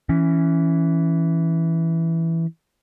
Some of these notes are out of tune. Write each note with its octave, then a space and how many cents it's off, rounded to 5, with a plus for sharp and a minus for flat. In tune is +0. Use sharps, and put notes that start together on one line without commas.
E3 +0 C#4 +0